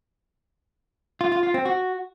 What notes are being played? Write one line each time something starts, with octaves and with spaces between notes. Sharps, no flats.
F4
F4
F4
C4
F#4